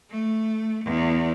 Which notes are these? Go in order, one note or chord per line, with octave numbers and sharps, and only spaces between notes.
A3
E2